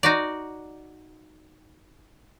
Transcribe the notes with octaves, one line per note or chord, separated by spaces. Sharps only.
D#4 F#4 D5